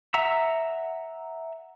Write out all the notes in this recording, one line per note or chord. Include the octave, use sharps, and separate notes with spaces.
E5 F#5 A#5 E6